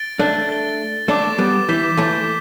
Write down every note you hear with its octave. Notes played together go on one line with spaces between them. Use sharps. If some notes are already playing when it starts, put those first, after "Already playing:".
Already playing: A6 D7 G7
A3 D4
A6 G7
A3 D4 D6 A6 E7
G3 B3
E3 G6 B6 E7 G7
E3 A3